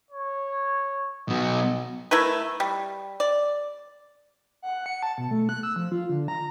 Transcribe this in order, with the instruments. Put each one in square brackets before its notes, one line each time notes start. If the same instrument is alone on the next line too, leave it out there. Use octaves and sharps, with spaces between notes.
[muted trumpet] C#5
[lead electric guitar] B2 F#3 [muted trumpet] D#5
[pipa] A3 E4 A#4 B4
G3
D5
[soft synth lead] F#5
C#7
A5
B2
A3
F#6
E6
F3
F4
D3
A#5